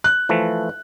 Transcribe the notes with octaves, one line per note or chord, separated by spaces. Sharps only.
F#6
E3 F3 A3